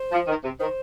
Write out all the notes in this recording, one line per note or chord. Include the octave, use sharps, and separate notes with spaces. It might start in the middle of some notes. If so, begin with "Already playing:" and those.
Already playing: C5
F3
D#3
C3
D#3 C5